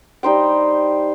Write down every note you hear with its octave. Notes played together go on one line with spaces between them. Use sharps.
G3 D#4 C5 G5